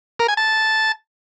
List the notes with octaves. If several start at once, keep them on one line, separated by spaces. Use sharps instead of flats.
A#4
G#5
A5